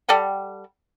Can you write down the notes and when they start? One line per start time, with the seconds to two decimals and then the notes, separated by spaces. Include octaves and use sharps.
0.09 G3 A4 F#5 G5